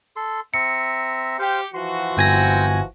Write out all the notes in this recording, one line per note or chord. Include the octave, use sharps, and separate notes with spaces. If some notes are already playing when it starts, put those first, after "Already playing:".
A4 C6
C4 E5 A#5 C#7
G4 C5 F5
E3 F3 F#4 C6
G1 C4 G5 G#5 A#6